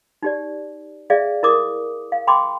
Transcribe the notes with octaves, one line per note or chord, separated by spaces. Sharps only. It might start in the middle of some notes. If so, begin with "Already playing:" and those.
D#4 G4 D5
G#4 D5 E5 F5
E4 A#4 D6 D#6
F5
G5 B5 C6 D6